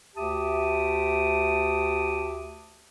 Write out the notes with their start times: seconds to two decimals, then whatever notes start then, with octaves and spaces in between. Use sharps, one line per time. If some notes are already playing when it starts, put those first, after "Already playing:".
0.16 D2 G4 E5 A5 D6 D#6